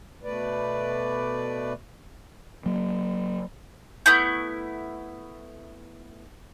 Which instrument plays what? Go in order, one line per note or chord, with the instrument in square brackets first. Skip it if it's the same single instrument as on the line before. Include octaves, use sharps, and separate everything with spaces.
[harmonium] B2 A3 B4 D5
[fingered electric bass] F#3 A#3
[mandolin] A3 B3 E4 G6